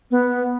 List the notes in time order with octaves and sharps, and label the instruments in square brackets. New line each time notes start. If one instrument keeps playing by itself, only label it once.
[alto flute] B3